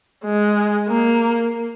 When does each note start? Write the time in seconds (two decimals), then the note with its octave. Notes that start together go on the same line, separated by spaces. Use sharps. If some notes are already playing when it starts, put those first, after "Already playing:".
0.24 G#3
0.88 A#3